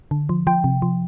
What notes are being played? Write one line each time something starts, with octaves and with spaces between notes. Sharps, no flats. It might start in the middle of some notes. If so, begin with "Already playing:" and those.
D3
F3
F3 G5
C3
F3